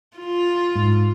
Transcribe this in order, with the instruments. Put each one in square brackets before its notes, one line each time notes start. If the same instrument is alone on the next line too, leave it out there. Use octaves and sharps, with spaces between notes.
[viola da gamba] F4
[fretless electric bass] G#2